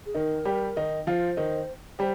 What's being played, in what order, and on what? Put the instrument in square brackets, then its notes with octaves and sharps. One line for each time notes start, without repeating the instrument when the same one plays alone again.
[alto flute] G#4
[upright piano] D#3 D#4 [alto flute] A#4
[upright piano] G3 G4
D#3 D#4
[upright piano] F3 F4 [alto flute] C5
[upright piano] D#3 D#4
[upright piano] G3 G4 [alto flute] C5